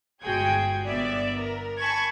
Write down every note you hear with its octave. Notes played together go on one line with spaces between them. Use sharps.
G1 G#3 F#4 G#4 G5 G#6
G1 B3 D5 E5
A#4
G#5 A5 B5 C#6 G#6